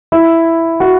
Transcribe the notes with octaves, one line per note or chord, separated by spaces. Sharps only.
E4
F#4